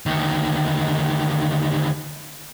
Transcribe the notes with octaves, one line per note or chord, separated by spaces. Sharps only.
D2 D#3